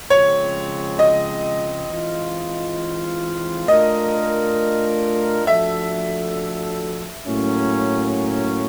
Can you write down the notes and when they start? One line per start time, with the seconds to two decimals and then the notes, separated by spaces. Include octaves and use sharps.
0.10 C#3 F3 G#3 C4 C#5
0.99 D#5
1.89 E3 G#3 C4 F4
3.68 A3 D4 F4 A#4 D#5
5.46 F3 A3 D4 F#4 A4 E5
7.26 A2 F#3 A#3 C#4